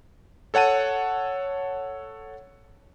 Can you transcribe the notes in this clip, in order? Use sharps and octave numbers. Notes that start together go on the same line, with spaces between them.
A4 C#5 F#5 A5 D#7